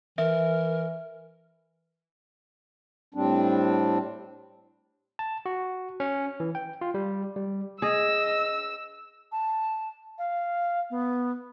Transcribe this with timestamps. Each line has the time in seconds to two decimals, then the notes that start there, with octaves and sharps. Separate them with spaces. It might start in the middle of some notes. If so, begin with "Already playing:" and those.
0.18 E3 A#4 E5
3.14 A2 G3 C4 D4
5.19 A5
5.46 F#4
6.00 C#4
6.40 E3
6.55 G5
6.81 F4
6.94 G3
7.36 G3
7.82 G#4 D#5 E6
9.32 A5
10.18 F5
10.90 B3